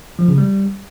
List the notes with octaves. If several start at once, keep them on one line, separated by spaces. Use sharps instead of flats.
F3
C#3
G3